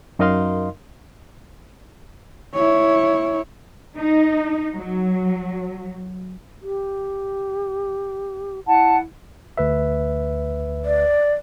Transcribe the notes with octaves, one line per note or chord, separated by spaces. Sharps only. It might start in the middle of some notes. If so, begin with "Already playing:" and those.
F#2 D#4 A#4 D#5 F5 C6
E4 C#5
D#4
F#3
G4
E4 F#5 A5
D2 B4 E5
D5